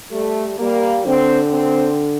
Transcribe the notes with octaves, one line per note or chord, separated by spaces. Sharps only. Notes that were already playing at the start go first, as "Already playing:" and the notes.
G3 A3
G3 A#3
D3 C4
C4